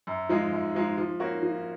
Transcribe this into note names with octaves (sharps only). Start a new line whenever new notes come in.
F#2
F3 G#3 D#4 G#4
F#2
F3 G#3 D#4 G#4
F3
A#3 C#4 F#4
F3